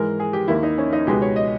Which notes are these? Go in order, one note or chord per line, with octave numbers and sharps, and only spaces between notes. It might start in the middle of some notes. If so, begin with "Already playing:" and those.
Already playing: G#2 E3 G#3 A#4
G#4
G4
D#2 D#3 A#3 E4
D#4
C#4
D#4
C#2 B2 G#3 B3 G4
C#5
D#5